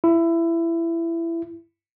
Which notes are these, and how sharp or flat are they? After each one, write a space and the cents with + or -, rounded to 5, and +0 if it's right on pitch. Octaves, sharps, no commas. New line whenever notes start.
E4 +20